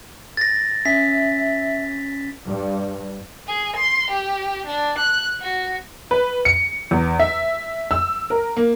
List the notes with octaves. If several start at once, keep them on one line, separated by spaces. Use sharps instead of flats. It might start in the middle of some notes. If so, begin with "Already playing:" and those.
A6 A#6
C#4 E5 B6
G2
G#4
C6
G4
D4
F#6
F#4
B4
C#7
E2
E5
E6
A#4
A#3